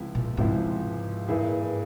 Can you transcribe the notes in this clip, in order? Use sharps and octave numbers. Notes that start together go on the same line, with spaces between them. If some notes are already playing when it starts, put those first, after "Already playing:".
Already playing: C#2 C3 F3 G#3 E4
A#2
C#2 G#2 C3 F3 G#3 E4
G2 E3 A#3 E4 G#4